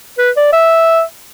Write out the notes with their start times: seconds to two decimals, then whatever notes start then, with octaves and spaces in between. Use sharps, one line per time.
0.18 B4
0.37 D5
0.53 E5